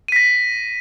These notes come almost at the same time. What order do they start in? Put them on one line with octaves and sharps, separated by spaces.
D#7 B6 A#6